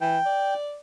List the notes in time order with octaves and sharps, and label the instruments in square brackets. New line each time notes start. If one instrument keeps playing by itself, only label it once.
[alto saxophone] E3 [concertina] G5
[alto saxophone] D5